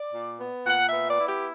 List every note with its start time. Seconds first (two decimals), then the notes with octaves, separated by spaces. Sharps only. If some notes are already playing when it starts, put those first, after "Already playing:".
Already playing: D5
0.13 A#2
0.40 B3
0.66 A#2 F#5
0.86 E5
0.93 B3
1.07 D5
1.20 E4
1.27 G4